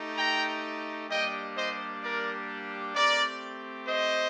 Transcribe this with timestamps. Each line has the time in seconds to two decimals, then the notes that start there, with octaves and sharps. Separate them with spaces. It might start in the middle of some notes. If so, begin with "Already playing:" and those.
Already playing: A3 D#4 G4
0.16 G5 A#5
1.09 G3 A#3 D4 G4 D#5 G5
1.55 C5 D#5
2.01 A#4 D5
2.93 A3 C4 G4 A#4 D5
3.86 C5 D#5